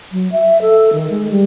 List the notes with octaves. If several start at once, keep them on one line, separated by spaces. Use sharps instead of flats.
F#3
E5
A4
D#3
G#3
G3